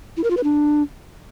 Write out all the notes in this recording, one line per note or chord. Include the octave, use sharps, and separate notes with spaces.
E4
A#4
F4
B4
D4